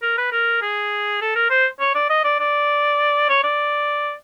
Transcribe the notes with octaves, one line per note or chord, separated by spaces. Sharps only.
A#4
B4
A#4
G#4
A4
A#4
C5
C#5
D5
D#5
D5
D5
C#5
D5